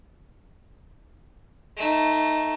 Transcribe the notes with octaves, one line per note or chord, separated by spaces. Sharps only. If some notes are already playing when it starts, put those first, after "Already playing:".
A3 D#4